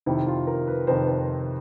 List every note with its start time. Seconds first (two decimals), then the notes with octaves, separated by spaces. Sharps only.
0.06 F2 C3 D#3 E4
0.27 F4
0.47 A#4
0.67 B4
0.87 F2 C3 D#3 C5
1.08 C5